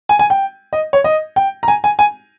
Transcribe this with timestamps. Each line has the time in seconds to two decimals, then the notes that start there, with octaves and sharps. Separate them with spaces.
0.09 G#5
0.19 G#5
0.30 G5
0.73 D#5
0.93 C#5
1.04 D#5
1.36 G5
1.63 A#5
1.68 G#5
1.84 G#5
1.99 G#5